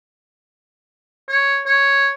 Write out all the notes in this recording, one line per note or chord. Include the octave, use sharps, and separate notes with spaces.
C#5
C#5